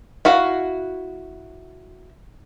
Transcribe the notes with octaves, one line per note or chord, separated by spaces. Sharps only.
E4 F#4 F5